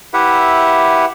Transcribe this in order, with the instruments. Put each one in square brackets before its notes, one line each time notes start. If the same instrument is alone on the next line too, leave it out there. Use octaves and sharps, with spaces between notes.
[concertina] E4 G4 B4 E5 F#5